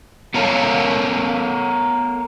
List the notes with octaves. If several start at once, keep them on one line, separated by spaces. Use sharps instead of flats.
B3 A4 A#4 C#5 F5 A5